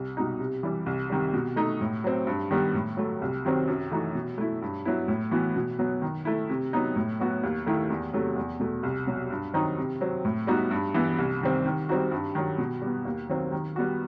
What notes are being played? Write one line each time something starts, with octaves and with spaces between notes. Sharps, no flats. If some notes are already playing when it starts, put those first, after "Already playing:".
Already playing: C2
B2 G3 D#4
C3
E3 G3
C2
C3 D#3 G3
B2
A3 D#4
A2
F#3 C4
G2
D#3 G3 B3
A2
F#3 A3
C2
C3 D#3 F#3 C4
F#2
E3 A3 D#4 F#4
B2
A3 E4
G2
F#3 B3 E4
A2
E3 B3 F#4
B2
F#3 B3
D#3
A3 E4
C3
F#3 B3 D#4
A2
F#3 B3 F#4
D#2
D#3 A3 E4
E2
C3 F#3 A3
E2
B2 A3
C2
B2 F#3
G2
D#3 F#3 C4 D#4
C3
F#3 C4
A2
G3 B3 D#4 F#4
G2
E3 B3
C2
C3 D#3 G3 C4
D#3
G3 C4 D#4 F#4
G2
D#3 F#3
B2
G3 B3
D#2
D#3 F#3 C4
D#3
G3 B3 F#4